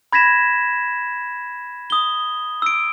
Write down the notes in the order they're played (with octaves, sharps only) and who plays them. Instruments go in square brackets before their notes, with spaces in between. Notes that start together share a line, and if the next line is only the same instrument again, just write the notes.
[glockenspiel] B5 G#6 A#6 B6 E7
D#6 G7
E6 D7